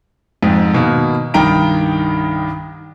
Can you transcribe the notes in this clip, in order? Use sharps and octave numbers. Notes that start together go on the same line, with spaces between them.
F2 G#2
B2 D#3 A#3
C2 G2 D#3 G5 A#5 D7